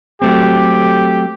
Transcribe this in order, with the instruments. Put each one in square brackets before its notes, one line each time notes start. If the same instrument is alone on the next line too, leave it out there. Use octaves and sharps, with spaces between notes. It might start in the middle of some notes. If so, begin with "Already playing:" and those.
[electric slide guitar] F#3 A3 C4 [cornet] G4